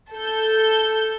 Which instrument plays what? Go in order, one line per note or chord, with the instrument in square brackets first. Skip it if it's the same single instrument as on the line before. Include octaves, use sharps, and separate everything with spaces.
[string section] A4 G6